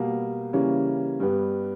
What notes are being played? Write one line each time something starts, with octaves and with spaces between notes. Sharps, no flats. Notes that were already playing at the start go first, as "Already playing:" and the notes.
Already playing: B2 G3 A#3
C#3 E3 G3 A#3 C#4
G2 G3 B3 G4